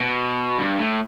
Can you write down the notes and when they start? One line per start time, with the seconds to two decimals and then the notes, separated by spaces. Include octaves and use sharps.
0.01 B2
0.59 G2
0.79 A2